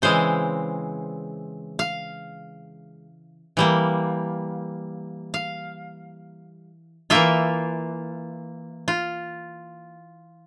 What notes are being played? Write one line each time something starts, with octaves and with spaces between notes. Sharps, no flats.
C#3 E3 G#3 C4 C5
F5
E3 G3 A#3
F5
E3 A#3 F4 E5
F4